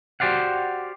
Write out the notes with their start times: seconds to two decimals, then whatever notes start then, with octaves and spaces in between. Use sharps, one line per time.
0.20 F#4 G4 C5 D5 F5 F#5